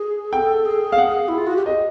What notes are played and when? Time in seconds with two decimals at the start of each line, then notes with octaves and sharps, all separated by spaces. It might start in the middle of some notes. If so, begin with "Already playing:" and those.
Already playing: G#4
0.32 A4 G5
0.65 G#4
0.92 F5
0.98 F#5
1.28 E4
1.38 F4
1.47 F#4
1.56 G4
1.65 G#4 D#5